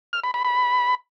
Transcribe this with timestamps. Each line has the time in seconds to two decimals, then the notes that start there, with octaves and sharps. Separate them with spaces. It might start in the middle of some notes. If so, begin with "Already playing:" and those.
0.13 F6
0.24 B5
0.34 B5
0.45 B5